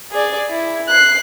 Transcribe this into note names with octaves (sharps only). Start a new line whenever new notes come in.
G#4 D5
E4
F#6 C7